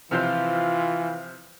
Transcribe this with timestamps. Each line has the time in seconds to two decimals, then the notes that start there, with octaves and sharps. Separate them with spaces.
0.11 C3 E3 F3 F4 C5